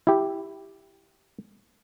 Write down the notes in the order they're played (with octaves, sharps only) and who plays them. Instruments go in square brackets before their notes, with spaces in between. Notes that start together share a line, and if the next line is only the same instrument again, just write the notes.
[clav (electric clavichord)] E4 G4